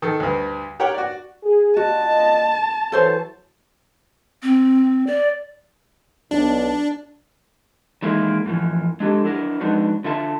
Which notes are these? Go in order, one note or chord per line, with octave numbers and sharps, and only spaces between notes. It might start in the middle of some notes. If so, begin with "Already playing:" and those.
D#3 A4
D2 G2
G4 A#4 C#5 F#5 G5
F#4 D5
G#4
A#2 F#4 D#5 A5
E3 F#3 A4 C5 C#5
C4
D5
B1 D4
D#3 E3 G#3 A#3 E4
F#2 A2 E3 F3
G#3 D4 G4 A4
F#3 D4 E4 A#4
F2 G#3 D4 D#4 F#4 B4
D3 F4 E5 A5